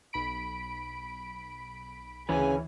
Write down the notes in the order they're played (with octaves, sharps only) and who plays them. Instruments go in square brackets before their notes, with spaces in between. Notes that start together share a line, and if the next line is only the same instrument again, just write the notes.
[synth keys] B1 B5 D7
[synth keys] D2 E3 [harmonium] C#3 G#5 [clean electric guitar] C#4 B4